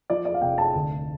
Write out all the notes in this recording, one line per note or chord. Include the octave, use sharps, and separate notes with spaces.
F3 D5
D5
F5
F1 G5
A5
D2